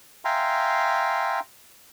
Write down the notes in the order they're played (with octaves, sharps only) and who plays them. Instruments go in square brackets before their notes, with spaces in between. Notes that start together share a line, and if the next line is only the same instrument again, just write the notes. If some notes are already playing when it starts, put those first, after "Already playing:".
[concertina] E5 F5 G5 G#5 A#5 C6